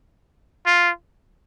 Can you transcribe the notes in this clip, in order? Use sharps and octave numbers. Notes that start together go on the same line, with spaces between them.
F4